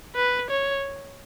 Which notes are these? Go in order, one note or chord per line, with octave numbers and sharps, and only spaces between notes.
B4
C#5